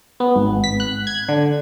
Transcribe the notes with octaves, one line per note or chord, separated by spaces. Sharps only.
B3
G#1
B6
F#6
G#6
D3